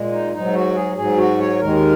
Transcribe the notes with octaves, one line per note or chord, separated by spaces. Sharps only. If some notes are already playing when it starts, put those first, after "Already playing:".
Already playing: A#2 G#3
D#4
G#2 F#3 D#4
F#4
G#4
G#2 F#3 G#4
F#4
C#5
D#2 D#3 G#3 A#4